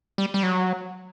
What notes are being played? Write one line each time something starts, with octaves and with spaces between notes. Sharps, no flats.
G3
G3
F#3